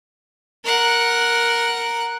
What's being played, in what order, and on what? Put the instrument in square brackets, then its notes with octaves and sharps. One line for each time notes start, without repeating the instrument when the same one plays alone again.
[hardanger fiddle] A#4 F#5